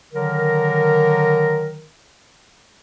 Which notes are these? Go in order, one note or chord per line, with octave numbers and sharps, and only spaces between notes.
D3 D#3 F#3 A#4